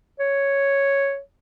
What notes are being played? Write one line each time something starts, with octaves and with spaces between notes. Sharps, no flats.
C#5